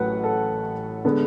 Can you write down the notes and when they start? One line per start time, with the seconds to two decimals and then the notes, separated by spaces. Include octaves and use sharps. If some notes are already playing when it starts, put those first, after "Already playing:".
Already playing: A1 A2 F#3 A3 B4 F#5
0.24 A4
1.05 D3 G#3 B3